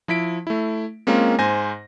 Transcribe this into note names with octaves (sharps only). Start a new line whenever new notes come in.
F3 E4 B6 D7
A3 E4
G#3 A#3 C4 C#4 F4 A#4
G#2 C5 G#5 A#6